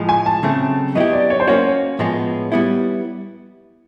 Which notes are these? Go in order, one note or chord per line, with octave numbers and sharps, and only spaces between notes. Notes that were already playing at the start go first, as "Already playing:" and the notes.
Already playing: A2 F3 G#3
G#5
A5
C#3 F#3 A3 C4
F#3 B3 E4 G4 D#5
D5
C#5
C5
A#3 C#4 F#4 C#5
A2 F3 G#3 B3
G3 B3 E4